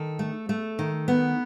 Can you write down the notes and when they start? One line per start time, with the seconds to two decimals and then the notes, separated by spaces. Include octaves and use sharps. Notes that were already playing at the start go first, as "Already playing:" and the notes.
Already playing: D#3 A4
0.19 A3
0.49 A3
0.79 D#3
1.08 B3